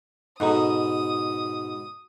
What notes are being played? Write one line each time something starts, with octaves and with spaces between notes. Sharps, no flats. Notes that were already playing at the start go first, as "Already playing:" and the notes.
G#2 B2 A4 D#5 A#5 D#6